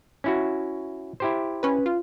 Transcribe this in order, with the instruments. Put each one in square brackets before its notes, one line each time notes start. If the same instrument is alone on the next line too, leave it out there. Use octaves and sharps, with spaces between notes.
[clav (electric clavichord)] C#4 E4 F#4
E4 G4 C5
[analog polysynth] C#4 B4
F4